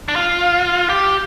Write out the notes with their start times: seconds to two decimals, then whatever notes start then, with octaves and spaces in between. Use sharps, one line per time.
0.08 D4
0.16 F4
0.89 G4